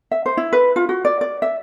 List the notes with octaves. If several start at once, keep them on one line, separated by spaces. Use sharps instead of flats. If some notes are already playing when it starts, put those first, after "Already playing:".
E5
C5
E4
B4
F4
F#4
D5
D5
E5